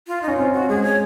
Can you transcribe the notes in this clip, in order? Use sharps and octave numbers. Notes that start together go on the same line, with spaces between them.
F4
D#4
C#4
C4 F4
F#4
G#3 G#4
C#5